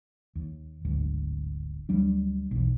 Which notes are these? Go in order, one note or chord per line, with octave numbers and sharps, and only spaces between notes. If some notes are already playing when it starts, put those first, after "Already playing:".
D#2
D1 G#1 D2
D2 F#3 G3 D4
B1 E2